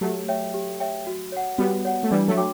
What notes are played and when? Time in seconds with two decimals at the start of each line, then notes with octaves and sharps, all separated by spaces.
0.01 F#3 A3 G4
0.28 C#5 E5 G5
0.54 G4
0.80 C#5 E5 G5
1.07 F#4
1.32 C#5 F#5
1.58 G3 B3 F#4
1.85 C#5 F#5
2.03 A3
2.11 E3 G3 D4
2.28 F#3 A3
2.37 F#4 C#5 G5 D6